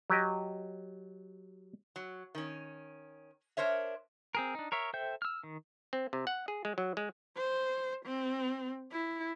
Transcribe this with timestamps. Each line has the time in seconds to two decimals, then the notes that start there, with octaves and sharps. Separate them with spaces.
0.10 F#3 G4 D#5
1.96 F#3
2.35 D#3 C#4
3.57 D4 A#4 C5 C#5 E5
4.35 C4 G#4 A#4
4.55 D4 D#4
4.72 A#4 C#5 E5
4.94 A4 C5 E5 G5 G6
5.22 E6 F6
5.43 D#3
5.93 C4
6.13 C3
6.27 F#5
6.48 G#4
6.65 G#3
6.78 F#3
6.97 G#3
7.37 C5
8.05 C4
8.92 E4